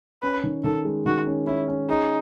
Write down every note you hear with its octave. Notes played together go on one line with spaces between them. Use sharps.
C#4 B4
D#3
D#3 A4
G#3
D#3 F#4
C#4
C#4 E4
C#4
D#4 G#4